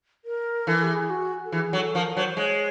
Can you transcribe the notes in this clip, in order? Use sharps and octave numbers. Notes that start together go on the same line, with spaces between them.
A#4
E3 A4
G4
G#4
F#4
A4
E3 G#4
F#3 A4
F3 A#4
F#3 C5
G#3 C#5